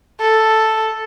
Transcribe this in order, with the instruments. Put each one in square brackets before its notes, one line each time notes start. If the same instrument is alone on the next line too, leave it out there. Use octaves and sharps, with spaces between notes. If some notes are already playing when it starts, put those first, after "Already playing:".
[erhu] A4